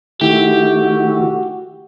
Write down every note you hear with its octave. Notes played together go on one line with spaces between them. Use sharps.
D#3 A3 E4 F#4 G4